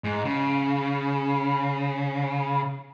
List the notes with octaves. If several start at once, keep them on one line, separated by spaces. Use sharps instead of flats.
G#2
C#3